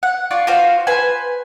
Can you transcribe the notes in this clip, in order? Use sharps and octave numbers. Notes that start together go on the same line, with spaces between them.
F#5
F4 D5 C#6
F4 F#4 C5 F5
B4 C5 G#5